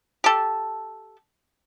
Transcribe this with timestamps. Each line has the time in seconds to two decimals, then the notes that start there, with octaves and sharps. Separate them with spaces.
0.24 G4 A4